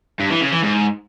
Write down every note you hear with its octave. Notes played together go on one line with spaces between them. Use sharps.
G2
E3
C#3
E3
G#2